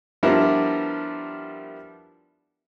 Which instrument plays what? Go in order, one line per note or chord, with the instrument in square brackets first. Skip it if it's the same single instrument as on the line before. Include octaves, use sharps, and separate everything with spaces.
[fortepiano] F3 G3 B3 D4 E4 A#4